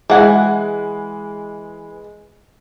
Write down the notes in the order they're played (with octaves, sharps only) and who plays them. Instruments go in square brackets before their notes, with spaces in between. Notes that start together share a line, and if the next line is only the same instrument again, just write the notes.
[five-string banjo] E3 F#5 G#5 [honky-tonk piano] G#3